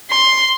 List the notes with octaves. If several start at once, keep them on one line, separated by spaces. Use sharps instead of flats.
C6